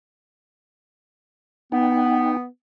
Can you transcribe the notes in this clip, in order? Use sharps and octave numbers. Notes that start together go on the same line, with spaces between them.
B3 D#4 G5